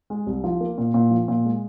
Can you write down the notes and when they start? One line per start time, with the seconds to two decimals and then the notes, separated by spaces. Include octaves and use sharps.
0.10 G#3
0.27 C2
0.44 F3
0.61 A#3
0.78 A#2
0.94 A#2
1.11 F3
1.28 A#2
1.45 G#3